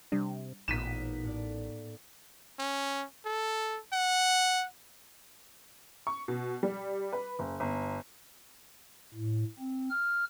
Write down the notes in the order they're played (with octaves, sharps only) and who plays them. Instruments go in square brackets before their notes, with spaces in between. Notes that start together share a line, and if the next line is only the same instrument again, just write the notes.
[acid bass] C3 [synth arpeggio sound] G3 D4
[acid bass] A1 [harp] A#2 B3 D#4 [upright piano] B6 D#7 E7
[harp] A2 D5
[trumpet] C#4
A4
F#5
[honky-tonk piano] C#6
B2
G3
B4
F#1
G1
[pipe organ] A2
C4
F6